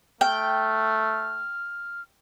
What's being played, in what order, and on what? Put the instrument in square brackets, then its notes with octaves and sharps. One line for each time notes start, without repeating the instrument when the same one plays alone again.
[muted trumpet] A3 [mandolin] G5 [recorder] F6